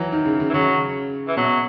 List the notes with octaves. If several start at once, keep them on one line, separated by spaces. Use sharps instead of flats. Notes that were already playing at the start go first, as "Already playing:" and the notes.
Already playing: E3 F#3
D#3
C#3
C#3
E3
C#3 F#3
E3
B2 F#3